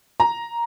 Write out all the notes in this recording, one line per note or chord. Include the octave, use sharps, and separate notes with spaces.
A#5